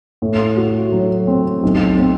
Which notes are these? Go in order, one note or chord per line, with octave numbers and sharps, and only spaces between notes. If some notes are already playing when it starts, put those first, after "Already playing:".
A2
F#4
F#3
C4
B1
C4